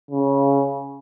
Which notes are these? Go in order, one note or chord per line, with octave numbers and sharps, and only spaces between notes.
C#3